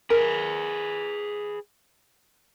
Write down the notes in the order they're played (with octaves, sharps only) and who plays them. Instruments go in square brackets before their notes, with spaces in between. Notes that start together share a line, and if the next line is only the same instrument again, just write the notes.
[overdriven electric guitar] G#4 B4 [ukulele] A#4